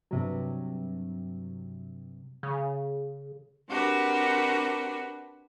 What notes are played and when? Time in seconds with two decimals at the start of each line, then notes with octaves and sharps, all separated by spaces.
0.11 G2 C3 F#3
2.43 C#3
3.68 C4 D4 F#4 G4 A#4 B4